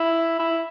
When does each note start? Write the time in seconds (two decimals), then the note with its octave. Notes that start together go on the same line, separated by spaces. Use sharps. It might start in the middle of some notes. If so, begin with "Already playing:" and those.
Already playing: E4
0.39 E4